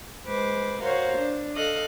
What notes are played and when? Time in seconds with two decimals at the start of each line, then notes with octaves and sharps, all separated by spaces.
0.25 G#3 B4 C5 D6
0.82 F#4 A#4 C5 C#5 F5
1.17 D4
1.55 A4 D#5 F5 F#6